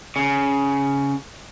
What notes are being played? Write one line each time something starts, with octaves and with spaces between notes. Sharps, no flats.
C#3